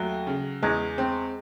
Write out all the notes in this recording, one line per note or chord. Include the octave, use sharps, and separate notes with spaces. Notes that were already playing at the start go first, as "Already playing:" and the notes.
Already playing: D#2 F#3 A3
C#3
E2 G#3
C4